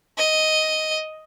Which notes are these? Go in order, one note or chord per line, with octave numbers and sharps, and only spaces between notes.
D#5